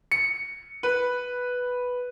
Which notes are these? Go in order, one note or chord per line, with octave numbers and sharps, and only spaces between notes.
C#7
B4